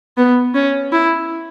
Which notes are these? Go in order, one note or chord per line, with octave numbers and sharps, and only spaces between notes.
B3
C#4
E4